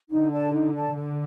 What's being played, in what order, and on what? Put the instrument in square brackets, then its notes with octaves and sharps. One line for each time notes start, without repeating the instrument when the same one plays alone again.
[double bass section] D3 [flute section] D#4
[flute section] A4 D5 A5
D#4
A4 D5 A5
[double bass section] D3 [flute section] A4